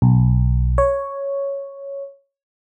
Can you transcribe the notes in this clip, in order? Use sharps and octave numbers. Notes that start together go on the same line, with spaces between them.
B1
C#5